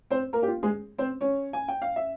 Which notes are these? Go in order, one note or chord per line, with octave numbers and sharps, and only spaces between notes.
C4 C5
A#3 A#4
G4
F4
G#3 G#4
C4 C5
C#4 C#5
G#5
G5
F5
E5